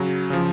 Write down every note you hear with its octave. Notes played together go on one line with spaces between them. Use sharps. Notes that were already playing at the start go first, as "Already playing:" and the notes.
Already playing: C#3 F#3
C#3 F3